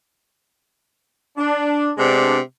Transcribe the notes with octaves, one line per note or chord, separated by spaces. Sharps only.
D4
C3 G#3 B3 D4